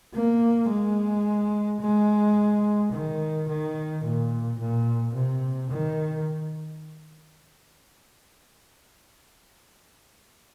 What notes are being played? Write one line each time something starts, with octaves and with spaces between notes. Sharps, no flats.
A#3
G#3
G#3
D#3
D#3
A#2
A#2
C3
D#3